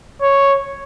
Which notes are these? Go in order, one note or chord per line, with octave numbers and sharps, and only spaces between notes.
C#5